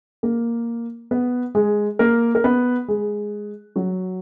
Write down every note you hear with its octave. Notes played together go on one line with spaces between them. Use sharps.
A#3 A#4
B3 B4
G#3 G#4
A#3 A#4
A#4
B3 B4
G#3 G#4
F#3 F#4